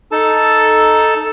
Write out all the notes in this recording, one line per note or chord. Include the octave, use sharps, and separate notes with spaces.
D#4 A4 A5